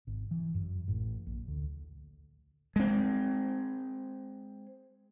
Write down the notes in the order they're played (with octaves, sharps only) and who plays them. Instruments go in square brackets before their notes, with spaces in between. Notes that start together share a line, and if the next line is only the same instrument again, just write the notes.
[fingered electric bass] G#1
E3
F#2
A1
A#1
D2
[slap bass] G#3 C4